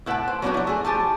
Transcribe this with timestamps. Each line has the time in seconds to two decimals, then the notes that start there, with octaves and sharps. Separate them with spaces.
0.06 A2 E4 B4 F#5 G5 A5
0.28 C5
0.42 F#3 B3 C#4 D4 F#4 G4
0.54 F#3 E4
0.67 A3 G#4
0.85 F3 G4 G#5 A5